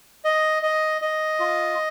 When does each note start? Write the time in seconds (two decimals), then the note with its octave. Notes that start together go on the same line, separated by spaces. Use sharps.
0.25 D#5
0.63 D#5
1.02 D#5
1.40 F4